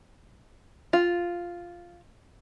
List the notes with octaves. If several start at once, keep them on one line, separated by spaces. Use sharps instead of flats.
F4